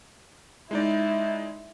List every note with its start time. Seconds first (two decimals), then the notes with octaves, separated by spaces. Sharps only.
0.71 G#3 D#4 E4 D5